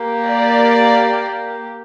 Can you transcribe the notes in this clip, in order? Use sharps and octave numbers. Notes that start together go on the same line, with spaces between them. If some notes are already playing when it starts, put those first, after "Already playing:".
Already playing: A#3 G4
D5